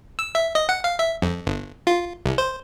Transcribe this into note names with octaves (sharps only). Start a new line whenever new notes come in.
E6
E5
D#5
F#5
F5
E5
F2
G1
F4
C2
C5